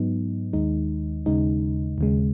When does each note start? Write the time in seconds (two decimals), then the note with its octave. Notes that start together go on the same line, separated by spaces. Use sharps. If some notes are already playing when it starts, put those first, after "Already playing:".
Already playing: G#2 F#3 B3 D#4
0.53 D#2 D#3 G#3 D#4
1.26 D#2 C#3 G#3 D#4
1.98 D#2 C#3 G#3